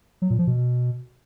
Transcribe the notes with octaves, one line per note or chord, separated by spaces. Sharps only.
F#3
A#2
F3
B2